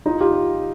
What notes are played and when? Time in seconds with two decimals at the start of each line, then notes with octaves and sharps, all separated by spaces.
0.06 D#4 F4
0.20 F4 G4